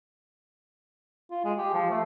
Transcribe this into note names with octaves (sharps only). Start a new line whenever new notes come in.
F4
G#3
G4
F3
A3